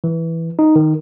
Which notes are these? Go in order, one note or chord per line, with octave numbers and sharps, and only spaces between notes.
E3
D#4
D#3